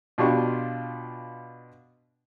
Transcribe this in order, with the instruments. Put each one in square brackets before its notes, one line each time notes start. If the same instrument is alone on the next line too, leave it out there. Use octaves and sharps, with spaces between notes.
[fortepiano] B2 D4 F4 G4 C#6